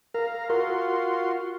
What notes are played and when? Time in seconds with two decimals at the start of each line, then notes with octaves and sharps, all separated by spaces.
0.14 A#4 F5 A#5
0.49 F4 F#4 A#4 C6